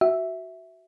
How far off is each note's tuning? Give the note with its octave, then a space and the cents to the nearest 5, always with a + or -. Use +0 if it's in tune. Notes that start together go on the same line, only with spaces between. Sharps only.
F#4 +10 E5 -5